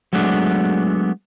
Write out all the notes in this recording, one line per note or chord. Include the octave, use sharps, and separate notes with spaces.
F#3 G#3 A3 B3 D4